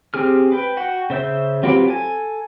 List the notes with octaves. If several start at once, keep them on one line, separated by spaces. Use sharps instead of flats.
C4 G4 G#4 F6
B4 G5
F#4 F#5 G5
C#3 C5 E5 G6
F#3 C4 F4 G4 B4
A4 G#5